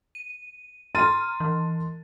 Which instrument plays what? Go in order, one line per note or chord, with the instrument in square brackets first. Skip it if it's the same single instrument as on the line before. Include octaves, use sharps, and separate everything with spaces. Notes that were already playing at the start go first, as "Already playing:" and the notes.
[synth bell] D#7
[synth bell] A#5 F6 [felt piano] C6 A6 D#7
[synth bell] E3